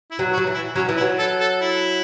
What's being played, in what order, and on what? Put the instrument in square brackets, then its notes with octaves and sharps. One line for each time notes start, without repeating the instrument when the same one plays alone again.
[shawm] E4
[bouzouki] F#3
[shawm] F#4
[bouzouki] F#3
E3
[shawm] E4
[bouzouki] F#3 [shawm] C#4
[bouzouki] E3
[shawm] E4
[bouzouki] F#3
[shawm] A4
A4
E4